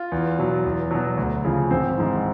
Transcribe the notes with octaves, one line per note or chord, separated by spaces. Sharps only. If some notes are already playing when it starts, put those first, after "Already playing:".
Already playing: F4
E2
B2 F#3
E2
B2 F#3
D2
C#3 F3
G#1 C4
G#2 E3